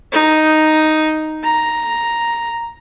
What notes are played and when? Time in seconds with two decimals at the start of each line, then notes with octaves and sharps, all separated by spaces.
0.12 D#4
1.44 A#5